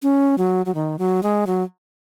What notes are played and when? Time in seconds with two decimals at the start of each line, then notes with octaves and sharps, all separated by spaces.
0.03 C#4
0.38 F#3
0.66 F#3
0.75 D#3
0.99 F#3
1.23 G#3
1.47 F#3